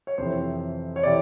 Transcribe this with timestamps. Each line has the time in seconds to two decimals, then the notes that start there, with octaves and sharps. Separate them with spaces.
0.07 C#5
0.18 F2 C3 E3 C5
0.96 C#5
1.03 C3 E3 D5